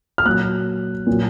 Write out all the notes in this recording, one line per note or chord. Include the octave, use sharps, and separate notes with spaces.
F6
A#2 F#3 F#6
A#2 F#3